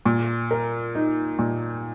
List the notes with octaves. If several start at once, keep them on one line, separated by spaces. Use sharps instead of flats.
A#2
A#4
D#4
A#2